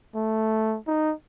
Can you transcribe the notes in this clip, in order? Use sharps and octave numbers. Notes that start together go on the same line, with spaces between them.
A3
D#4